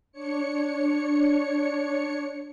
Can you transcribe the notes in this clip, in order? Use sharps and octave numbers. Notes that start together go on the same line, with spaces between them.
D4 C#5 C#7